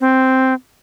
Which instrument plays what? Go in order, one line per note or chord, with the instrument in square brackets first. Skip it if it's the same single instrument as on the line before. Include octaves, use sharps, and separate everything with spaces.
[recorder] C4